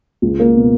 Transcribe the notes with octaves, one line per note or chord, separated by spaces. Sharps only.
C#2
A#3
B2